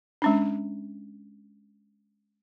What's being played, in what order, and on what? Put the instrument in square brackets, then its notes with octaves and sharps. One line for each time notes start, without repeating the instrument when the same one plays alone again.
[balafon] G#3 C#4 D4